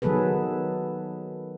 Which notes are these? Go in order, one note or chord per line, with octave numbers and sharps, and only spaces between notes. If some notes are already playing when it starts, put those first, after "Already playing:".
D#3 F#3 B3 G#4 A4 B4